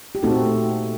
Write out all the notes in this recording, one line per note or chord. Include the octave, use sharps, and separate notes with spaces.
G4
A#2 A3 C4 D#4 F#4 A4